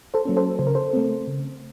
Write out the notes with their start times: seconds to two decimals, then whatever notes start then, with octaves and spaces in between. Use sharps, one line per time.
0.14 A4 C5
0.25 F#3 A#3 C#4
0.37 A4 C5
0.59 C#3 C5
0.67 A#4
0.75 A4 C5
0.93 A3 C4
1.28 C#3